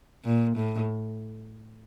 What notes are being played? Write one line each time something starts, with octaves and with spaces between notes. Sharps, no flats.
A#2
A2